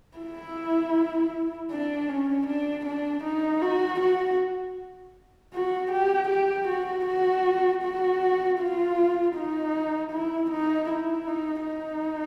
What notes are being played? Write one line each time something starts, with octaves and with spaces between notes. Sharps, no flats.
E4
D4
C#4
D4
D4
D#4
F#4
F#4
F#4
G4
G4
F#4
F#4
F#4
F4
D#4
E4
D#4
E4
D#4
D#4